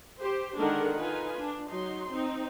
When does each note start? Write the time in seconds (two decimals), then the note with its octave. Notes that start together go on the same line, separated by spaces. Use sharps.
0.18 G4 C5
0.57 D3 D#3 G#3 D4 A#4 F#5
0.96 D#4 F4 B4 G#5
1.38 D4
1.69 F#3 D#4 C6
2.11 C4 D#4